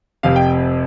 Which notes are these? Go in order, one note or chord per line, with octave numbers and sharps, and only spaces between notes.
F1 F2 C3 F5
G5